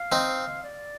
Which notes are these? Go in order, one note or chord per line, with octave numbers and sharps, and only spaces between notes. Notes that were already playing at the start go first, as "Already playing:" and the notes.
Already playing: F5
C4 D#4
D5